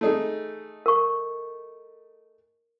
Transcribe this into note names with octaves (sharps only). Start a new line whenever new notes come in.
A3 D#4 G#4
A#4 C#6